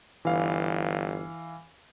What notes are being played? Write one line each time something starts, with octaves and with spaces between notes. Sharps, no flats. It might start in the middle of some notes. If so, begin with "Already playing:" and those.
G1 E3 F5